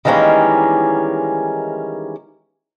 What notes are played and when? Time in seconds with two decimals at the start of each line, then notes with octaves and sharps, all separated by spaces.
0.05 D#3 E3 G3 G#3 A#3 C#4